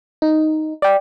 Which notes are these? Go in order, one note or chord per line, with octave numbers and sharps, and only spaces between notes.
D#4
D5 G5